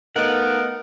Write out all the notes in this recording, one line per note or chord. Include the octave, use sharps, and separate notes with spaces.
A3 B3 D#4 A4 A#4 F5 F#5